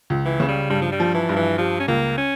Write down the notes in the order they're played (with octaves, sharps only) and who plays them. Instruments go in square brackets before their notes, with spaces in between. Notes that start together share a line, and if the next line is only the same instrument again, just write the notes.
[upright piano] C#2
[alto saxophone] E3
[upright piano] C#3
[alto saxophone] G3
[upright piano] G2 [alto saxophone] G3
[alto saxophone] F3
G3
[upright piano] F3
[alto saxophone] E3
[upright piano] G2
[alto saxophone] E3
[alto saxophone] F3 [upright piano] G3
[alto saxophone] C#4
[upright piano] C#2 [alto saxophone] A#3
[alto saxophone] C#4